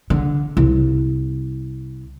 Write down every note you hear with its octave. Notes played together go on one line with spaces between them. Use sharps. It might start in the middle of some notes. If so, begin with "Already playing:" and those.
D3
C2